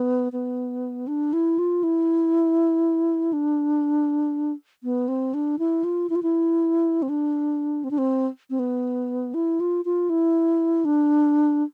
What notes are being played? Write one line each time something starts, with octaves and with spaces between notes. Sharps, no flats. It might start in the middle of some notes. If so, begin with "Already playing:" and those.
Already playing: B3
B3
D4
E4
F4
E4
D4
B3
C4
D4
E4
F4
E4
F4
E4
C4
D4
C4
D4
C4
C4
B3
E4
F4
F4
E4
D4